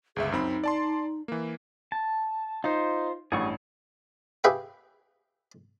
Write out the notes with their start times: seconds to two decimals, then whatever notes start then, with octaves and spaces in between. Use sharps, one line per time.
0.16 G1 C#2 G#4 E5
0.32 F#2 C4 D#4 B5
0.64 D5 A5 C6
1.28 E3 A#3
1.92 A5
2.64 D#4 F4 C5
3.32 A1 G2 G#4 F#5 C#6
4.44 G4 G#4 B4 E5 F5 G5